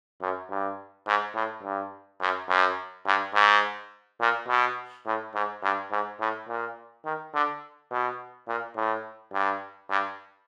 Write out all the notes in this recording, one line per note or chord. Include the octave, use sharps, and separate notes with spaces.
F#2
G2
G#2
A2
G2
F#2
F#2
G2
G#2
A#2
B2
A2
G#2
G2
G#2
A2
A#2
D#3
D3
B2
A#2
A2
G2
G2